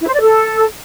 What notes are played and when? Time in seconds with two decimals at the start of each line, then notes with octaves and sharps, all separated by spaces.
0.01 E4
0.07 C5
0.14 D5
0.21 A4